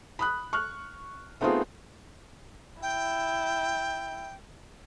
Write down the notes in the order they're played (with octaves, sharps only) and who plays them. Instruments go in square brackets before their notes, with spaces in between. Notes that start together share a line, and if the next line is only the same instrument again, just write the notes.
[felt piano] B5 D#6 F#6
C#6 F6 F#6
A3 B3 C4 D#4 F4 G#4
[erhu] E4 [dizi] G5